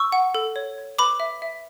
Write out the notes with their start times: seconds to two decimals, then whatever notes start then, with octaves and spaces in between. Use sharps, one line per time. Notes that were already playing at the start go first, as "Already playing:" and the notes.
Already playing: C#6 E6
0.12 F#5
0.35 A4
0.56 C#5
0.78 C#5
0.99 B4 B5 D6
1.20 E5
1.42 E5